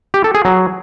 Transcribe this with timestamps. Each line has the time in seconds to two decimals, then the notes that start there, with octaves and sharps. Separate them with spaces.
0.14 G4
0.24 A4
0.35 G#4
0.45 F#3